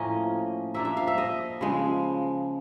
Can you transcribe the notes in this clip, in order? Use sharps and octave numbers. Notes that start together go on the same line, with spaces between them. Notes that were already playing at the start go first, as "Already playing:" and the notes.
Already playing: A2 F3 A#3 C#4 D#5
F3 A#3 D4 E5
E5
F5
E5
D#5
C#3 F3 G#3